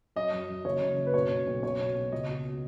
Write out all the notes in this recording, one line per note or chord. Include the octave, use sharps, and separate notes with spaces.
F#2 D#5
F#2
F#2
F#1 C#5
F#1
F#1
B4
B2 C#5
B2
B1
B2 C#5
B2
B2
C#2 D#5
B2